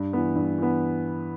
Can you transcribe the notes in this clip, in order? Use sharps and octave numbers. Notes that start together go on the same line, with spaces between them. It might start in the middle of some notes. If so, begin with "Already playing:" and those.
Already playing: G2
E3 B3
G2
E3 B3